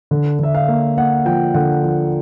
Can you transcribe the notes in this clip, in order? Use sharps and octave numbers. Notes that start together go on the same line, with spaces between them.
D3
D3 E5
F5
A#3
A#3 F#5
F3 G5
D3 F#5
F3